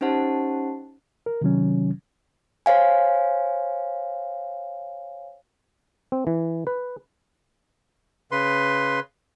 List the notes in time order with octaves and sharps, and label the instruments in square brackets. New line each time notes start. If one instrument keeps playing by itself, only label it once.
[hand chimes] C#4 D#4 G4 C5 F#5 A5
[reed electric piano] A#4
C3 D#3 F#3 C#4
[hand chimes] C5 C#5 F5 G#5
[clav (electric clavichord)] C4
E3
B4
[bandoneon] C#3 B4 C6